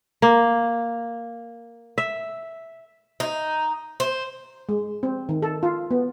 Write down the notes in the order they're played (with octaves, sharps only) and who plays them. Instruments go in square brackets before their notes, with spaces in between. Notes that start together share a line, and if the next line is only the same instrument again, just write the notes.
[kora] A#3
E5
[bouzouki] D#4
C5
[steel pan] G#3
C4
D#3
A4
F4
B3